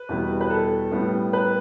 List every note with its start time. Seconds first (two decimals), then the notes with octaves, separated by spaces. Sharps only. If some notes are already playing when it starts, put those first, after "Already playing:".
Already playing: B4
0.09 E2 B2 G3 B3
0.41 B4
0.50 A4
0.91 A2 G3 B3
1.33 B4